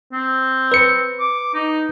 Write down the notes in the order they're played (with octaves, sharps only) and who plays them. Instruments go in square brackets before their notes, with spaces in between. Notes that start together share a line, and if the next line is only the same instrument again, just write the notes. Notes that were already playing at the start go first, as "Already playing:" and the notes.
[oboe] C4
[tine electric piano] B4 C#7
[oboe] D6
D#4